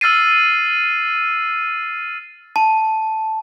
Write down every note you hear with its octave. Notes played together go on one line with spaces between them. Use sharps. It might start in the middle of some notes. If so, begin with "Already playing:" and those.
E6 F6 A6 C7 D#7
A5